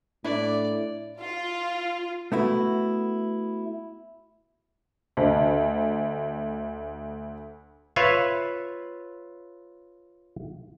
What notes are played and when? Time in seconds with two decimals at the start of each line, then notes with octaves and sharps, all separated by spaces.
0.24 A2 D4 E4 D5
1.20 F4
2.32 A3 B3 E4 F#4
5.17 D2 C5 D#5 A5
7.96 F4 B4 C#5 E5 F5